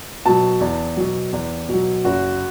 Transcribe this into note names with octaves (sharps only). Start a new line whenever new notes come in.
B2 F#3 A5
E2
B2 F#3
E2
B2 F#3
F#1 F#4